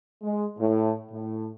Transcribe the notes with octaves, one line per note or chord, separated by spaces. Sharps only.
G#3
A2
A2